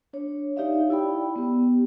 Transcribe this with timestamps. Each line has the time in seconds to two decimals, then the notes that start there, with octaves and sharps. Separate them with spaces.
0.13 D4 C#5
0.56 D#4 G4 C#5 D5 E5 F5
0.90 E4 D5 G5 B5
1.36 B3 G4